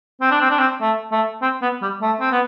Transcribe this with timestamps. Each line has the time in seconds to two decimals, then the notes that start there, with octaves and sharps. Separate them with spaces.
0.21 C4
0.31 D4
0.41 C4
0.51 D4
0.59 C4
0.81 A3
1.11 A3
1.42 C4
1.62 B3
1.82 G3
2.02 A3
2.20 C4
2.32 B3